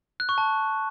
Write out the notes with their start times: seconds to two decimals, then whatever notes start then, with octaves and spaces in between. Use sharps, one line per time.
0.20 F#6
0.29 C#6
0.38 A5